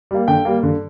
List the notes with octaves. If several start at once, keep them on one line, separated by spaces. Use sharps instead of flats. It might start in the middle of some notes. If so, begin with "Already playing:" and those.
G3 A#3
D3 G5
G3 A#3
D3